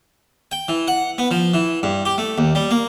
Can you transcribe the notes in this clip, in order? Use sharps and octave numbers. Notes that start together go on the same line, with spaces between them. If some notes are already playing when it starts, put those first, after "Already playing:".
G5
E3
F#5
B3
F3
E3
G2
G4
A3
D#2
G3
A#3